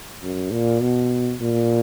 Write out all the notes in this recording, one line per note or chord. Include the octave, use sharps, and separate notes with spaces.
F#2
A#2
B2
A#2